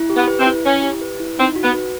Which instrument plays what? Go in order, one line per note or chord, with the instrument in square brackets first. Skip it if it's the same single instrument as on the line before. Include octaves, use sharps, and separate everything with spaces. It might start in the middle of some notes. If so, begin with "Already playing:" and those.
Already playing: [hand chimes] E4
G4
[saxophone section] B3
[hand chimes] B4
[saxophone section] C4
[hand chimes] E4
[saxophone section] C#4 [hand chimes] E4
[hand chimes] G4
B4
E4
[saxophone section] C4 [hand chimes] D#4
[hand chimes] F#4
[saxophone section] B3
[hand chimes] B4